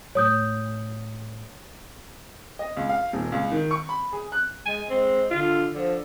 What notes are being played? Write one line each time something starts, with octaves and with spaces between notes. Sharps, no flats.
A2 C#5 D#6 G6
D#5
C#2
F5
D#1
C#2
D#3
C#6
B5
G#4
F#6
G#3 G#5
G#3 C4
D3 F4
D3 F3